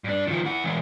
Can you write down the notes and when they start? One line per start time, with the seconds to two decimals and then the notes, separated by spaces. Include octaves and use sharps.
0.04 G2 D4
0.27 D#3 F3
0.45 E4 F#5
0.64 E3 G#3